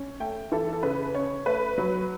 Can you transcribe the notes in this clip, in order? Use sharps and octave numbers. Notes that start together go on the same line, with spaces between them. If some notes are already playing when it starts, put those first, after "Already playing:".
Already playing: C#4
A3 G5
E3 A4
A4
C#3 B4
C#4 C#5
A3 B4
F#3